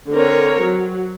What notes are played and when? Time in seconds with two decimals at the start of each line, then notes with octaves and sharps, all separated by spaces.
0.10 D3 C4 A#4 C#5
0.64 F#3